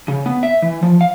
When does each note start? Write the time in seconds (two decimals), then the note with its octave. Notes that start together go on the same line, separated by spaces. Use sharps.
0.08 C#3
0.26 B3
0.43 E5
0.62 E3
0.83 F3
1.01 F5